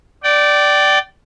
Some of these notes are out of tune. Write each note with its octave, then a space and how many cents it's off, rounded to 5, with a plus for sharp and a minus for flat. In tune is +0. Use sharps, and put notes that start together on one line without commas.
D5 +0 G5 -30